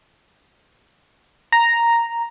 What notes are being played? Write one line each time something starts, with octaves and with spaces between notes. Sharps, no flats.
A#5